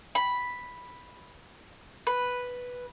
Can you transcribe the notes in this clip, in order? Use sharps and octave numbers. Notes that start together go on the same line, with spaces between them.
B5
B4